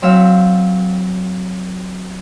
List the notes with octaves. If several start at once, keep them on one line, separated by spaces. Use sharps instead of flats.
F#3 C4 E5 F5 E6